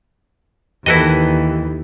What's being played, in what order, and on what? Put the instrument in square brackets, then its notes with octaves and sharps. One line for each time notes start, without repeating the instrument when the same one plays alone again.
[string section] D#2 [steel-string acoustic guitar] E3 [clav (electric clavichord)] E4 F#4 D#5 [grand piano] G4 A4 B4